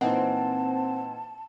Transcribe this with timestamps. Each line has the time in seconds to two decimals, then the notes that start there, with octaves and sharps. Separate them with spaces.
0.01 A#2 E3 C4 D#4 F#5 A5